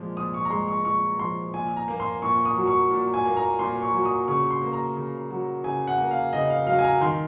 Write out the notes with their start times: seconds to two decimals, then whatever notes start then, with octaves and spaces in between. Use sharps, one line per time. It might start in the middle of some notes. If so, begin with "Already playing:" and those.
Already playing: A#2 F3 G#3
0.17 A#2 D#6
0.34 C#6
0.45 A#5
0.51 G#3 C6
0.68 C#6
0.85 A#2 C#6
1.19 F3 C6
1.54 A#2 G#5
1.76 A#5
1.88 A#3
2.00 C6
2.22 A#2 C#6
2.45 D#6
2.57 F#3
2.67 C#6
2.91 A#2
3.14 G#5
3.25 A#3
3.37 A#5
3.59 A#2 C6
3.82 C#6
3.93 F#3
4.05 D#6
4.28 C#3 C#6
4.51 C6
4.61 A#3
4.73 A#5
4.97 C#3
5.30 F#3
5.64 C#3 G#5
5.87 F#5
5.98 A#3
6.11 F5
6.33 C#3 D#5
6.50 F5
6.67 F#3 F5
6.79 G#5
6.84 A#5
7.01 D#3 C6